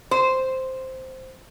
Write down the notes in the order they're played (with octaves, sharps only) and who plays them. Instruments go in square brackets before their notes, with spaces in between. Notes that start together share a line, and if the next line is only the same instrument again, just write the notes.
[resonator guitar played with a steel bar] C5